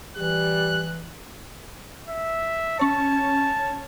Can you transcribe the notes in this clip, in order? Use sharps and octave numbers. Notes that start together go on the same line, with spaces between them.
E3 G3 F#6
E5
C#4 C#5 A5